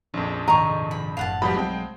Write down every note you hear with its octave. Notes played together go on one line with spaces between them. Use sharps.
A#1 F2 C#4
G#2 C3 D#3 D#5 A#5 C#6
B5
F#1 A2 F5 F#5 A5
B2 F3 G3 B5
B1 F#3 G#3 A3 C4 G5